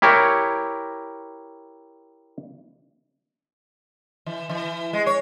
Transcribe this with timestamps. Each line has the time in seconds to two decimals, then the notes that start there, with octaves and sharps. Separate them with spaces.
0.02 E4 G4 A#4 C#5
4.26 E3
4.49 E3
4.93 G#3
5.06 C#5